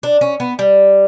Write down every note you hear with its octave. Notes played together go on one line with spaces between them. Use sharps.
D4
C#4
B3
G3